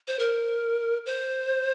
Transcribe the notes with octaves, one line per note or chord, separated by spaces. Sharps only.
C5
A#4
C5